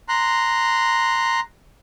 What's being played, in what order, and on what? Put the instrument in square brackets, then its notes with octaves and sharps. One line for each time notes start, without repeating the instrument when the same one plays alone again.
[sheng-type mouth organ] A#5 C6 F#6